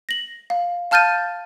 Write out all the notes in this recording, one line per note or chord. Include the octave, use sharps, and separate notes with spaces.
A#6 F#7
F5
F5 A5 F6 G6 A6 D#7